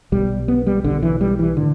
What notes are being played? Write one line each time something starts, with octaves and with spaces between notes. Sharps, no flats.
B1 B2 G3
B3
G3
B1 B2 D3
E3
G3
E3
A2 D3